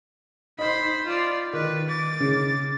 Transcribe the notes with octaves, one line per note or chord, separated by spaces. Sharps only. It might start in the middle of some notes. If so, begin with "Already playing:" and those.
D#4 C5 B5 B6
F4 D5
D#3 B4
D6 A6
C#3